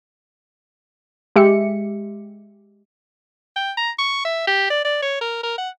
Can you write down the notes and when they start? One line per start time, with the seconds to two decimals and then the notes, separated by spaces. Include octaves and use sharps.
1.36 G#3 G4 E5 C#7
3.56 G5
3.78 A#5
3.99 C#6
4.25 E5
4.48 G4
4.71 D5
4.85 D5
5.03 C#5
5.21 A#4
5.43 A#4
5.58 F#5